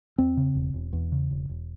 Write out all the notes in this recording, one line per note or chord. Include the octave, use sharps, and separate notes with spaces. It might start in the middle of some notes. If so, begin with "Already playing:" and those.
E2 C4
C#3
E1
E1
E2
C#3
E1
E1